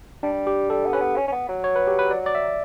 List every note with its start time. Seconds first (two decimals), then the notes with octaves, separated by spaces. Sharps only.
0.23 G3 D4
0.47 G4
0.70 G3 A4
0.86 B3
0.93 C#4 B4
1.01 B3
1.16 C#4
1.28 C#4
1.32 B3
1.49 F#3
1.64 C#5
1.76 B4
1.87 G4
1.99 B4
2.11 D5
2.26 D5
2.35 E5